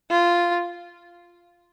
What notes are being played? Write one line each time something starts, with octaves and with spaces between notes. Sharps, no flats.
F4